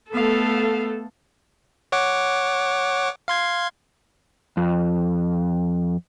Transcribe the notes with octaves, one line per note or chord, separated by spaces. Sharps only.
A3 B3 A4 F5
C#5 F#5 D6
F5 C6 G#6
F2